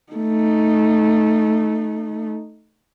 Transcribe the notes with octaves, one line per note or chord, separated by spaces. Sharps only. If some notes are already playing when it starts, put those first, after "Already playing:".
A3 D#4